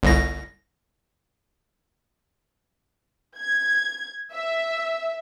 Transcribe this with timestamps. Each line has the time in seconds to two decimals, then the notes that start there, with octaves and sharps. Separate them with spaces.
0.03 G1 C2 A#6
3.37 G#6
4.32 E5